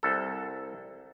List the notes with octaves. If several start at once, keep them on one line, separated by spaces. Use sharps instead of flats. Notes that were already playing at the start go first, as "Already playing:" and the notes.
C2 A4